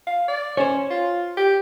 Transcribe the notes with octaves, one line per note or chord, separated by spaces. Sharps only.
F5
D5
C#4 C5 C#5
F4
G4